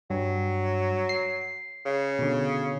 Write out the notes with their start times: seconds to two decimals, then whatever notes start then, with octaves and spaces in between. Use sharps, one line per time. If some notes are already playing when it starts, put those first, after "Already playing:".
0.10 G2 F#3
1.09 C7
1.86 C#3
2.19 B2 D3